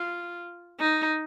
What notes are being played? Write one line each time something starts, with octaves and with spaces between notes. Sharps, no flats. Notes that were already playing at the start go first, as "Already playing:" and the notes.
Already playing: F4
D#4